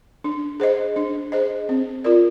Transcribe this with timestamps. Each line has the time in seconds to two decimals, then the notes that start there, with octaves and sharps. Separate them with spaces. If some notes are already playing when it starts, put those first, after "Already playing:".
0.24 D4
0.60 G#4 C5 D#5
0.96 D4
1.32 G#4 C5 D#5
1.69 C4
2.04 F4 A#4 D5